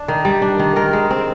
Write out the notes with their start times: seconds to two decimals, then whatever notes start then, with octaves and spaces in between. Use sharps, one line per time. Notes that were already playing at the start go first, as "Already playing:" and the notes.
Already playing: D4
0.08 D#3
0.25 G3
0.42 D4
0.59 D#3
0.76 D#3 A#4
0.93 G#3
1.10 C4